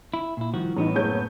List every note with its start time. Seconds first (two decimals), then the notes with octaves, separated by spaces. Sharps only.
0.14 E4
0.37 A#2 E4
0.54 D#3 F3 G3 E4 F#4
0.76 A1 A2 B3 D#4
0.95 F#1 C#5 G6